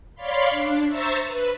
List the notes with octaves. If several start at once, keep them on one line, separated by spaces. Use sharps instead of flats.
C#5 D5 F5 B5 C6
D4
C5 E5 A#5 C#6 E6 A6
B4